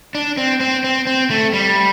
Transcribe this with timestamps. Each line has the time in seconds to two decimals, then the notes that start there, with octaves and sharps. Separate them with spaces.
0.15 D4
0.37 C4
0.60 C4
0.84 C4
1.07 C4
1.30 A3
1.53 G3